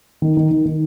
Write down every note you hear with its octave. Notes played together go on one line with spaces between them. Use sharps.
D#3
D#3
D#3
D#3